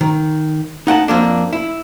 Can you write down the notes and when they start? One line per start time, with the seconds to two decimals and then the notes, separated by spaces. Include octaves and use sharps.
0.01 D#3
0.87 D#4 F#5 G5 A5
1.08 F2 A#3 D4
1.53 E4